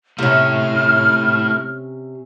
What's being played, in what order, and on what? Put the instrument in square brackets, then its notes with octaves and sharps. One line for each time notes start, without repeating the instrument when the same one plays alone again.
[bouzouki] C3 C#4 [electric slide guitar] A3 E4 [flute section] F6